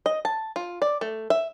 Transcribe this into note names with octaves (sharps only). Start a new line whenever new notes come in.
D#5
A5
F4
D5
A3
E5